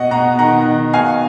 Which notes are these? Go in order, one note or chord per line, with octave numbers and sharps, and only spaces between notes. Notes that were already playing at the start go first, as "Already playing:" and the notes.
Already playing: B2 D#5 F#5
B2 F#5 A#5
D#3 F#5 A#5
D#3
B2 F5 G#5